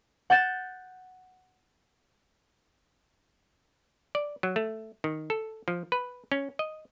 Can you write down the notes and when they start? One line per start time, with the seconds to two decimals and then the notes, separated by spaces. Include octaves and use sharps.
0.30 F#5 G6 A6 E7
4.15 D5
4.43 F#3
4.56 A3
5.04 D#3
5.30 A4
5.68 F3
5.92 B4
6.32 C#4
6.59 D#5